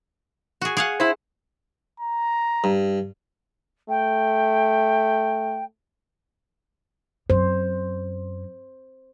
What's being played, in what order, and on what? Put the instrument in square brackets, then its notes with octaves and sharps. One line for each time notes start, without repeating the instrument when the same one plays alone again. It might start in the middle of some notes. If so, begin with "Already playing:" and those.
[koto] F#4 G#4
G#4 F5 F#5
[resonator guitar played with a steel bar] E4 C5
[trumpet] A#5
[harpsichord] G2
[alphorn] A3 [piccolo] G5
[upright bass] F#2 [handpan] C5